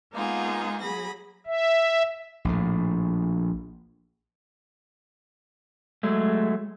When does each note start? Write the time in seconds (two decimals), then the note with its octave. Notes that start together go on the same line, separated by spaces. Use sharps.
0.13 G#3 A#3 B3 D#4 F4 G#4
0.82 F#3 G#4 B5 A#6
1.47 E5
2.45 A#1 A2
6.03 F#3 G#3 A3